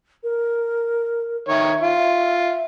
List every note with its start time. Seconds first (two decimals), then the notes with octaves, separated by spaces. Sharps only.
0.23 A#4
1.48 D#3 C#5 E5
1.81 F4